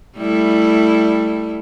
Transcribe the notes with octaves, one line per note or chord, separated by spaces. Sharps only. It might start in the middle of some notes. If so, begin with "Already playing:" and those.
G3 A3 E4